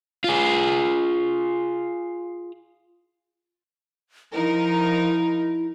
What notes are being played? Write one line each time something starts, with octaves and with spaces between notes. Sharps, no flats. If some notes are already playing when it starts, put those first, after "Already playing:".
F4 G#4
F3 D#4 E4 A#4